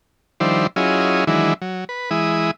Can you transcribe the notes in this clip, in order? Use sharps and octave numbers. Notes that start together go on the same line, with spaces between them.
D#3 F3 G3 D4 E4 C5
F#3 C#4 E4 F4 G#4 D#5
D#3 E3 F#3 G#3 D4 E4
F#3
B4
E3 G#3 E4 D#6